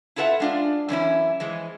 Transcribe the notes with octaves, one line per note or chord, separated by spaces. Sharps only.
E4 F4 A4 B4 E5 F#5
G#3 D4 F4
F#2 E3 C#4 E4
E3 F3 G#3